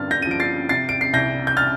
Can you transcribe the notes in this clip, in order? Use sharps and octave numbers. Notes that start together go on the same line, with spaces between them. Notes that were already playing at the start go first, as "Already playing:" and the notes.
Already playing: G2 D3 C4 F6 A6
G6 A#6
F3 D#7
D7
A6 C7
C3 A6 C7
D7
C7
C2 G6 A#6
G6
F6 A6